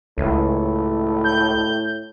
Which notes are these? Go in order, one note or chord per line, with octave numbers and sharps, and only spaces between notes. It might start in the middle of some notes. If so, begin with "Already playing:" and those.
C#2 A2
G6